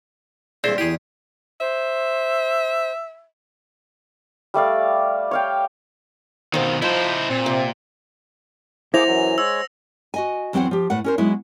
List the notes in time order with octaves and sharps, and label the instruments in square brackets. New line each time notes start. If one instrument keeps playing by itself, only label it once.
[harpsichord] G2 A#2 [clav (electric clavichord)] C4 E4 C5 [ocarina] G#4 [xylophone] D5
[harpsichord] E2 F#5 [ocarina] E4 [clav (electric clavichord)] G4 G#4
[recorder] C5 [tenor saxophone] E5
[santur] G3 A3 D5 F5
C#5 F5 G5
[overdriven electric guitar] B2 D#3 [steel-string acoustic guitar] C4 F5
[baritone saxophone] F3 [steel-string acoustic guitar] D#4 [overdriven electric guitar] E4 C5
[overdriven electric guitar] A#2 [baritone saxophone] C4
[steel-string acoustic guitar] C3
[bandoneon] A#3 G#4 D6 [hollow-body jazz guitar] E4 [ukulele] C5 F#5 [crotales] A#6 F7
[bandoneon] F#2 E3 F#3
[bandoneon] G#3 C#5 [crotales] E6
[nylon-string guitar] F#4 D#5 G#5
E2 F#3 C4 B4 C5 F#5
F3 G4
A2 B4 F#5
C#4 A#4 C5
F#3 G#3 B3 D#4 E4